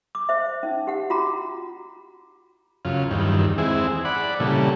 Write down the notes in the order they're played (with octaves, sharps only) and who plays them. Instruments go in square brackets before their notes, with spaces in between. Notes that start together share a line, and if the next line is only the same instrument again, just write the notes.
[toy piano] D6
C5 E5
E5
C#4 D#4
G4 F#5
F4 F#4 A#5 D6
[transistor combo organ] F#2 C#3 F4
E2 G2 D#3
E3 G#3 C4 E4 G#4
D5 F#5 B5
A#2 C#3 E3 G3 A4